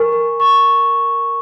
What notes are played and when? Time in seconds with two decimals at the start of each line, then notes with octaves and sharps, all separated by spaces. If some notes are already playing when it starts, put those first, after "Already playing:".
Already playing: A#4 G#5 C#6
0.12 A#4
0.40 C#6